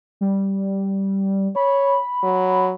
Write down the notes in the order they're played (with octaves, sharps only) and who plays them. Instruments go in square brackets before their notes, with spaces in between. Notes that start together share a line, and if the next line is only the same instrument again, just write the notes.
[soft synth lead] G3
[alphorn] C#5 [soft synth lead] B5
[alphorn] F#3